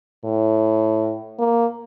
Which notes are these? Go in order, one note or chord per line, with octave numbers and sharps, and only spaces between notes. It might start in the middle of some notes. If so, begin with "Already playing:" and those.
A2
A#3